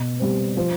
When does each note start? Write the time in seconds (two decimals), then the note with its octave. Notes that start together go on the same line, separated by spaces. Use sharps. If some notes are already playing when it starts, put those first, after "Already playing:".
Already playing: B2
0.20 G3 C4
0.57 F3